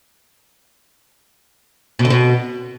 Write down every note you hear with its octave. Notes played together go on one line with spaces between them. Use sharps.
B2
D3
B2